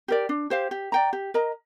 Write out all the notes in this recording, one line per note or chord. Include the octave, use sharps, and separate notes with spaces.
G4 A#4 D5
D4
G4 C5 F5
G4
D5 G5 A#5
G4
A#4 D#5 A#5